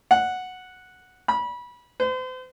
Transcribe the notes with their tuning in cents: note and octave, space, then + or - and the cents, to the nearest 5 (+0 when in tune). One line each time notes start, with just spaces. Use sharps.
F#5 -5
B5 -25
C5 -40